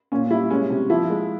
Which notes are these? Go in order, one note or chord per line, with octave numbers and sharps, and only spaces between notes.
A#2 C#4
G3 E4
G#3 C#4
C3
F3 E4
G#3